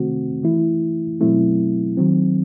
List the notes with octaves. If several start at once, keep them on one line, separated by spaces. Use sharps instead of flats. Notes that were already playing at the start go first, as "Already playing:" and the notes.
Already playing: C3 D#3 A3 C4 F#4
E3 A3 E4
B2 F#3 A3 C4 E4
D#3 F#3 C4